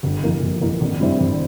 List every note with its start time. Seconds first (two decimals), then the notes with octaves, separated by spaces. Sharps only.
0.03 G1
0.23 F2 E3 A#3
0.42 G1
0.61 F2 E3 A#3
0.81 G#1
1.00 G2 G3 C4 E4
1.20 G#1